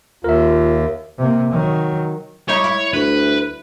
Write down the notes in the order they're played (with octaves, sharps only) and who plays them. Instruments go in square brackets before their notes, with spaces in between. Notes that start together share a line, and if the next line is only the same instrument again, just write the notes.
[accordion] D#2 [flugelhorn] F4 [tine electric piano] A#4 E5
[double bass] C3 A#3
D#3 F#3
[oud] G3 D#4 E4 [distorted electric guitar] C#5
[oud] E4
[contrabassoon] D2 [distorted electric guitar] B4